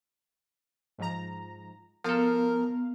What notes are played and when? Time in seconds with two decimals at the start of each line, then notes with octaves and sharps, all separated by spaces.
0.98 G#2 F3 A#5
2.04 F3 B3 A4 A#4 F5